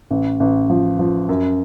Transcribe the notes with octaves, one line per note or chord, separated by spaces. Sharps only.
A1
A1
F3
F3
F#2